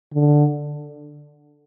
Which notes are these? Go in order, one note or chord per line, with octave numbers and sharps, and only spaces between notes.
D3